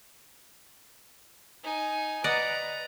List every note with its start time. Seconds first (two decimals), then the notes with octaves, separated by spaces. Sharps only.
1.63 D#4 G#5
2.24 B4 D5 D#5 F#5 A#5